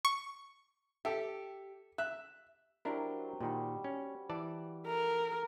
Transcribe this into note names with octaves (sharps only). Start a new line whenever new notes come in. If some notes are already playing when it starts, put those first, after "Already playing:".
C#6
G4 A4 E5
E5 F#6
F#3 D4 E4 G4 A#4 C5
A#2 D#3 G3 F#4
C#4
E3 D5 A5
A3 A4 A#4